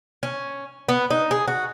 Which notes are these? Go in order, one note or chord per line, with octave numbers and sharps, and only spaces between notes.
C#4
B3
D#4
G#4
F#4